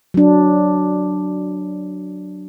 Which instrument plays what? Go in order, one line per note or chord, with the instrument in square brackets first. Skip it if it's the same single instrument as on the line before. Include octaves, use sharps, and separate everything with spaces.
[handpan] F#3 D4